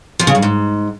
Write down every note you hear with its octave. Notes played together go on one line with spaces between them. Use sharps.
F3
C#3
G2
G#2